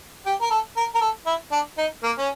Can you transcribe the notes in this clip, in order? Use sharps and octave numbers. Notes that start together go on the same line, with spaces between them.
G4
A#4
A4
A#4
A#4
A4
E4
D4
D#4
A#3
C#4